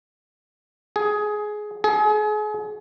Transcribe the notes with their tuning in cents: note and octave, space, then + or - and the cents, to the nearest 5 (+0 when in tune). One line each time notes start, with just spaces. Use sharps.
G#4 +15
G#4 +35